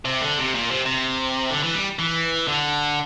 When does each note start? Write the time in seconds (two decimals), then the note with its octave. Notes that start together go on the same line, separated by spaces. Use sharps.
0.05 C3
0.21 D3
0.39 C3
0.55 A#2
0.71 C3
0.86 C3
1.50 D3
1.63 E3
1.74 G3
1.99 E3
2.48 D3